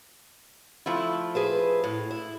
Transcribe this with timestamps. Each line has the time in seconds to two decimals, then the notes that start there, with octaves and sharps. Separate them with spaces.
0.86 F3 A3 E4
1.35 G#4 B4 C5
1.84 A2
2.11 E4